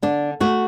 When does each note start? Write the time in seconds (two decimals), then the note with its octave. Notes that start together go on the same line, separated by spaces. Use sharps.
0.02 D3 D4
0.40 A3 F#4